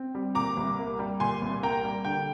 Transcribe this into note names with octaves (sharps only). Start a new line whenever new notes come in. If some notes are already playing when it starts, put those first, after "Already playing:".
Already playing: C4
G3
A#2 A#5 D6
C2
A#3
G3
A#2 G#5 C6
C2
A#3 G5 A#5
G3
D3 G5